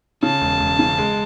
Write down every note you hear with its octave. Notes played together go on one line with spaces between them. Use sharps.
C#3 A5
E1
E1
C#3
G#3